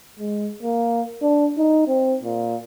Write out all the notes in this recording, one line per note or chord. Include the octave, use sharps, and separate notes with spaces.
G#3
A#3
D4
D#4
C4
A#2